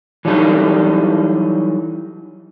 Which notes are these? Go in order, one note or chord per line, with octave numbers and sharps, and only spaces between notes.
E3 F#3 G3 D#4 A4